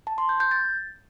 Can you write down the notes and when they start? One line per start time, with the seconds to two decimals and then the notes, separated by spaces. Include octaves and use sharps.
0.07 A5
0.18 C6
0.29 G6
0.40 G6
0.51 A6